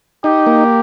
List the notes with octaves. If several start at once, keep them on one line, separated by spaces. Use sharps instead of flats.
D#4 G4
A#3